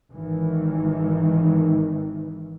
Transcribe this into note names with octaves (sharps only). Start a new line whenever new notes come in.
G#1 D#3 E3